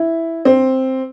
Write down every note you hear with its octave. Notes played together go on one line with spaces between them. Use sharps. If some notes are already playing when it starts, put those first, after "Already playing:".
Already playing: E4
C4